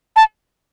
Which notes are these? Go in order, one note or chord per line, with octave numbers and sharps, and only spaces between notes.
A5